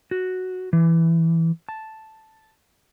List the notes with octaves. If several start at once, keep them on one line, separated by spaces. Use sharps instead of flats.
F#4
E3
A5